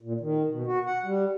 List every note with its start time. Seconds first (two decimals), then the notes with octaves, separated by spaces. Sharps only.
0.02 A#2
0.20 D#3
0.49 B2
0.66 F#4
0.86 F#5
1.04 G3